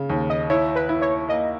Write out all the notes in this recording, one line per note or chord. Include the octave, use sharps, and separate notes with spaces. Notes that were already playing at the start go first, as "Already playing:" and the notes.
Already playing: C#3
D#2
D#5
E4 C#5
B4
E4
C#5
A#3 D#5